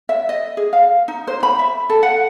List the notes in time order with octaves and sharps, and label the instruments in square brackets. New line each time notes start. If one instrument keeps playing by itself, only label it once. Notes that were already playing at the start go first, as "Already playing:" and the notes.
[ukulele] E5
D#5
G#4
F5
D#4
C5
B5
E5
A4
F#5